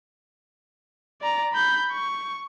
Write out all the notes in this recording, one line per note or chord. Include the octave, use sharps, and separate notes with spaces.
D5 A#5
B5 G6
C#6